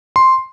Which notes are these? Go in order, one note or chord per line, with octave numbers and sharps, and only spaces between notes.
C6